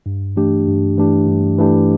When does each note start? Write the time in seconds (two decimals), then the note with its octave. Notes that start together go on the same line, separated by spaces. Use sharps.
0.06 G2
0.36 E3 A3 D4 G4
0.67 G2
0.97 E3 A3 D4 G4
1.28 G2
1.58 E3 A3 D4 G4